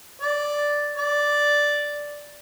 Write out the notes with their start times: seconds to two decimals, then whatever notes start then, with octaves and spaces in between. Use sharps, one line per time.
0.22 D5
0.96 D5